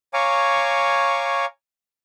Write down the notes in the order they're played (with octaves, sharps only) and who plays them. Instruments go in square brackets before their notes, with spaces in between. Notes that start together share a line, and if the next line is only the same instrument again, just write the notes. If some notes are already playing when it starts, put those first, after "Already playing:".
[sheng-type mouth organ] C#5 F5 G#5 A#5 C#6 D6